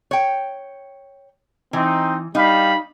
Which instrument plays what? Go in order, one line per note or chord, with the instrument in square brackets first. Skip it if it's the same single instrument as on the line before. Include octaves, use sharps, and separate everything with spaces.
[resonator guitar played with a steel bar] C#5 G5
[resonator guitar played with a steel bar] E3 [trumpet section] C4 D#4
[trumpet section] G3 F5 B5 [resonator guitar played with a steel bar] D#4